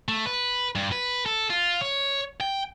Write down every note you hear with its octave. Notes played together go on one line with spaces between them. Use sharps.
A3
B4
G2
B4
A4
F4
C#5
G5